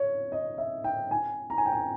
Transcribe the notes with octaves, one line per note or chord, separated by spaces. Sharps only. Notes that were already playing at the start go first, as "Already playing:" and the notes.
Already playing: C#5
D#5
E5
G5
G#5
A#5
G#5
G5
G#5